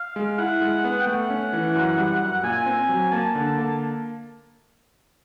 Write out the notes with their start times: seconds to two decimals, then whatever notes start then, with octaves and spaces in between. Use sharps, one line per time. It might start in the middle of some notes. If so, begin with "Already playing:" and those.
Already playing: F5
0.16 G#3
0.38 E4 F#5
0.62 G#3
0.84 B3
1.00 G5
1.07 A3 F#5
1.30 C#4
1.53 E3
1.76 F#2
1.97 G3
2.21 F#2
2.43 A#2 G#5
2.66 C4
2.89 F#3
3.12 A#3 A5
3.35 D3
3.58 A#3